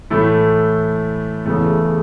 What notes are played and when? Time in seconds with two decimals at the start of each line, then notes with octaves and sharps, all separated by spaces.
0.10 A2 E3 A3 E4
1.46 E2 C#3 E3 A3